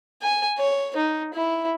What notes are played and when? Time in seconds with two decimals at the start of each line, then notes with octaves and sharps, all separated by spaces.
0.22 G#5
0.58 C#5
0.96 D#4
1.34 E4